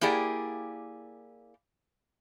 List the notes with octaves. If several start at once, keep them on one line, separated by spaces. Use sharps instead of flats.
A#3 E4 G4 G#4 D5 G5